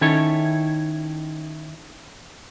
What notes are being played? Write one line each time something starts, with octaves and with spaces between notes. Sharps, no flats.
D#3 C#4 E4 A4 C#5